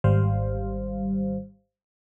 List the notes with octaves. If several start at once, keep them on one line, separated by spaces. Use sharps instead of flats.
G#1 G3 C5 F5